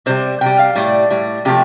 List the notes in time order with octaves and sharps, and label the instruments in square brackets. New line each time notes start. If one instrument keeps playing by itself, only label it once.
[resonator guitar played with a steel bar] C3 G3 C5
C3 G3 G5
F5
A2 G3 D5
A2 G3
C3 F3 A3 G4